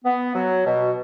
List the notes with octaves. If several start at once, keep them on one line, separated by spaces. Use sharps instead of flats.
B3
F#3
B2